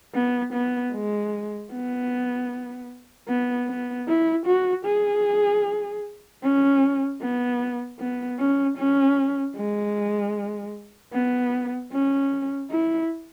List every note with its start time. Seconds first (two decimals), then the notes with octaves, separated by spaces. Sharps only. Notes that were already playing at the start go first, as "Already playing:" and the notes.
0.15 B3
0.53 B3
0.93 G#3
1.72 B3
3.29 B3
3.68 B3
4.07 E4
4.46 F#4
4.85 G#4
6.43 C#4
7.21 B3
8.00 B3
8.39 C#4
8.78 C#4
9.57 G#3
11.14 B3
11.93 C#4
12.71 E4